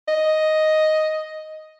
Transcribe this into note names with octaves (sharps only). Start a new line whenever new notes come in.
D#5